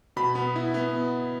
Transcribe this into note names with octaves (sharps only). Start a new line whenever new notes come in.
B2 B5
B3
E4
B3